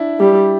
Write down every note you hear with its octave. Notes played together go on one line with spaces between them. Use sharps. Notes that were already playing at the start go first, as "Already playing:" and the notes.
Already playing: D4 E4
G3 G4